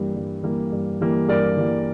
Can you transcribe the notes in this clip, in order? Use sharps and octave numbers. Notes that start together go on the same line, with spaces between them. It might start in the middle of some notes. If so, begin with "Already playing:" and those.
Already playing: G2 E3 G3 A#3
G2
E3 G3 A#3
G2
E3 G3 A#3
G2 A#4 D5
E3 G3 A#3